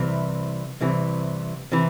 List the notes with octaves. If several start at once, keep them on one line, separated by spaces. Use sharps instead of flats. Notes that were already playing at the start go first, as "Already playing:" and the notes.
Already playing: C2 C3 E3
C2 C3 E3
C3 E3